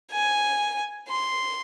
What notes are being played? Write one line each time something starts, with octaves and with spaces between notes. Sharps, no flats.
G#5
C6